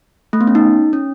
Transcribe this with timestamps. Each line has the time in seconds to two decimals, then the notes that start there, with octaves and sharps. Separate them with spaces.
0.33 A3
0.41 B3
0.47 C#4
0.55 D#4
0.93 C#4